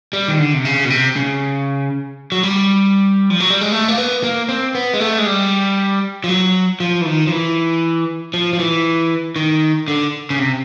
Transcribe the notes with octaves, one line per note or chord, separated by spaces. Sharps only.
G3
D#3
D3
C3
C#3
B2
C3
C#3
F#3
G3
F3
F#3
G3
G#3
A3
A#3
B3
A#3
C4
B3
G#3
A3
G#3
G3
F3
F#3
F3
E3
D#3
F3
E3
F3
F3
E3
D#3
D3
C#3
C3